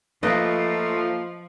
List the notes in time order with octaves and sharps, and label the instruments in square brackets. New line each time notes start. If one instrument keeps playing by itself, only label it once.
[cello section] F3 [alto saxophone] A3 [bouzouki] A#3 [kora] B4 D#5